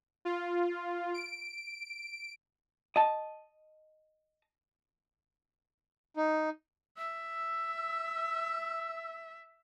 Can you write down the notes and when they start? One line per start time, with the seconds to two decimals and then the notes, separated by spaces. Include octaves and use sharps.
0.25 F4
1.14 D7
2.96 D#5 A5
6.17 D#4
6.98 E5 E6